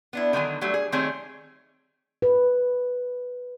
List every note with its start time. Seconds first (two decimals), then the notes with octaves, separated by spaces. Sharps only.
0.13 B3 D4 E4
0.33 D3 D#3 F#3 G#5
0.61 F#3 G3 A3
0.74 G#4
0.92 D#3 G3 A3 C4 G#4 C#5
2.22 B4